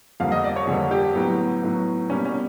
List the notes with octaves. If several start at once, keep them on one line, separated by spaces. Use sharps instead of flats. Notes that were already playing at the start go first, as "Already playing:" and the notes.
F2 D3 G3 A#3 F5
D#5
D5
C#5
F2 D3 G3 A#3 G#4
G4
A2 F#3 B3
A2 F#3 B3
B2 G3 A#3 C#4
C#4